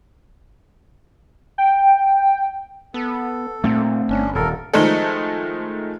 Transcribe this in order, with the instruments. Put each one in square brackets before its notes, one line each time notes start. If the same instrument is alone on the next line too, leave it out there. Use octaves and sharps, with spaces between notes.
[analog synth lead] G5
[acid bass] B3 [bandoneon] A4
[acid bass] A#2 [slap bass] A3 C4
[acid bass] G1 [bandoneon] C#4 D4
[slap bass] D#1 [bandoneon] A4 A#4
[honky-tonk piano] D#3 F3 G#3 A3 D#4 A4